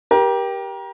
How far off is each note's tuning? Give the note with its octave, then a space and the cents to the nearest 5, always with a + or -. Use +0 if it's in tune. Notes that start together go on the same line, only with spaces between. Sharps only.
G4 +0 A#4 +30